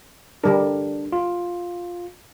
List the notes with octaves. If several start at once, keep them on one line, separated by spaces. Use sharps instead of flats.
D3 G3 D4 A#4
F4